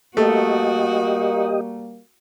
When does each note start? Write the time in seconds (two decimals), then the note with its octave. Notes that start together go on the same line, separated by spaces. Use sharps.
0.17 G3 A3 A#3 F#4 G4 D#5